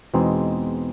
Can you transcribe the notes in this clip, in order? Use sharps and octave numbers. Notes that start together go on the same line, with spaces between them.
E2 B2 G#3 C4 D#4